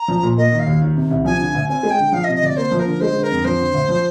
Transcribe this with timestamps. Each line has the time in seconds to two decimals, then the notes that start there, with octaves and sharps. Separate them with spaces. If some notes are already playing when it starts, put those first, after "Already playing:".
Already playing: A#5
0.08 F3
0.23 A#2
0.37 A#3 D#5
0.52 D#3
0.59 F5
0.67 D#2
0.81 D#3
0.96 C3
1.11 C2
1.25 F3 G#5
1.39 D3
1.55 D2
1.69 C4 G#5
1.83 G#3
1.91 G5
1.99 D3
2.13 F3 F5
2.24 D#5
2.28 C3
2.35 D#5
2.42 D2 D5
2.56 A#3 C5
2.72 F3
2.79 A#4
2.87 D3
3.00 G#3 C5
3.15 D3
3.23 A#4
3.31 F2
3.45 F3 C5
3.60 D3
3.74 D2
3.89 F3